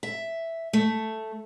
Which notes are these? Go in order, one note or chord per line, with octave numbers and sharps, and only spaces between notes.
E5
A3